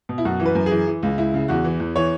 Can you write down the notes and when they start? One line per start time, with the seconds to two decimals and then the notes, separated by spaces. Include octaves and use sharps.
0.09 B2
0.18 E4
0.25 F#2 F#4
0.40 E3
0.46 B4
0.55 F#2
0.66 E3 G#4
0.87 E3
1.03 C#2
1.18 C#2 E4
1.34 C#3
1.48 E2 F#4
1.64 E3
1.80 E2
1.96 E3 C#5